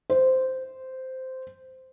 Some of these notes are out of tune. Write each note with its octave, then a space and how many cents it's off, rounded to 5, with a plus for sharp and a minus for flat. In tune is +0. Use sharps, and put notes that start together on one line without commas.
C5 -10